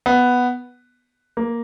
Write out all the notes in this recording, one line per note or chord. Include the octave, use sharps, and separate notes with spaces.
B3
A#3